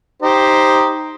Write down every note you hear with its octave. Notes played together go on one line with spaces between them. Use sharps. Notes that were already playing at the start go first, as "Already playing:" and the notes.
D#4 G4 C5